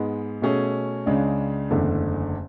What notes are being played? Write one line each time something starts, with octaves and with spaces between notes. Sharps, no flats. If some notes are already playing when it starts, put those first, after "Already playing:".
Already playing: G#2 G#3 B3
B2 A3 C#4 G#4
C#2 C#3 G#3 D4
F#1 E2 D3 A3